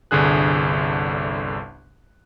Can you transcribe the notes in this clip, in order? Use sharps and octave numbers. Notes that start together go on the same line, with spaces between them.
G1 C2 D3 G#4 F#6